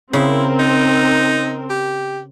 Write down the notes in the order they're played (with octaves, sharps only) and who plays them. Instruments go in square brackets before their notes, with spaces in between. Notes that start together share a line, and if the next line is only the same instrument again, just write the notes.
[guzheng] C#3 [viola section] C4 A#4 [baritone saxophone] E4
[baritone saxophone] D#4
G4